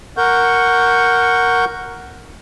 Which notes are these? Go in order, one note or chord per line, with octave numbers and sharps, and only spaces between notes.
A#4 F#5 C#6 G6